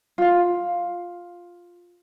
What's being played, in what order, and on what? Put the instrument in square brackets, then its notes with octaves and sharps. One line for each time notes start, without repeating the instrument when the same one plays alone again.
[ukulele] F4 F5